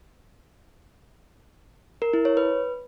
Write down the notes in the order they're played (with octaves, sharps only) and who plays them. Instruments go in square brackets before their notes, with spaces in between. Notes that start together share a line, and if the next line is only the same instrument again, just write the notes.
[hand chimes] A#4
E4
C#5
B4